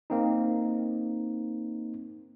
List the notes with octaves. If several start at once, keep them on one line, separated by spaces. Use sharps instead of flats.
A#3 C4 D#4